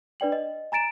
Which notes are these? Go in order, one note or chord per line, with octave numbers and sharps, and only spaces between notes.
D4 B4 D5 G5 F#7
D#5
G#5 A#5 A6 D7 E7